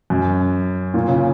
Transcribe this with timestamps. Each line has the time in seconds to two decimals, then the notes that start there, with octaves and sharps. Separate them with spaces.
0.10 F#2
0.94 A#2
1.08 C#3